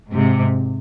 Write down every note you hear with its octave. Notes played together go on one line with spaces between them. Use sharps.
G#2 C3